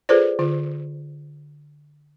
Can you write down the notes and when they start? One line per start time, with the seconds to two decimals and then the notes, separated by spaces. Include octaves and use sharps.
0.09 F4 G#4 A4 B4 C5 D5
0.39 D3 F4